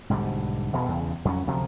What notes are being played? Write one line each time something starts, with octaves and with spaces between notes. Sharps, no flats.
B1 G#2 D3 G3
E1 B2
E2 C#3
F2 F#3 C#4
D2 C3 F3 F#3